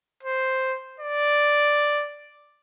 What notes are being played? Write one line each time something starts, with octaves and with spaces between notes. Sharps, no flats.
C5
D5